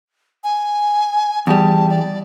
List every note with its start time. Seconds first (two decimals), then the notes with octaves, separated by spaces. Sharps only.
0.44 G#5
1.47 E2 G3 A5
1.90 D5